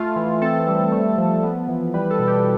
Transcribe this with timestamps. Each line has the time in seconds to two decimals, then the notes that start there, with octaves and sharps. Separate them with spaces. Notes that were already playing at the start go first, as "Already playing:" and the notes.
Already playing: A3 F4
0.16 E3
0.41 C4 A4
0.67 G3
0.92 A3
1.17 F3
1.43 B3
1.68 E3
1.94 G3 B4
2.10 A4
2.19 B2
2.27 G4